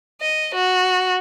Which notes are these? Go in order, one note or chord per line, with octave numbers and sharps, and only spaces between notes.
D#5
F#4